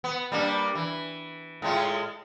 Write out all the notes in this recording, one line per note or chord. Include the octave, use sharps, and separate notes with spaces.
B3
G3 A#3 D4
E3
A2 G#3 F4